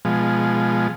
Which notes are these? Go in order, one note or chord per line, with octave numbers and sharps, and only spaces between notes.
B2 F3 G#3